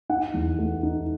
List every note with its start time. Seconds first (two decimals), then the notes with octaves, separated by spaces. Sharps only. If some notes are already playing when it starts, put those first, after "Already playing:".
0.09 D#4 F#5
0.34 E2
0.59 A3
0.83 D#4